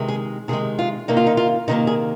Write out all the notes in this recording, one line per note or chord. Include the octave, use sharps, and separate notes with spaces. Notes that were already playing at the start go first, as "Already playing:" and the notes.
Already playing: C3 D#3 G#3
G#4
C3 D#3 G#3 G#4
F4
C3 D#3 A#3 D#4
F4
D#4
F4
C3 D#3 A#3 D#4
G#4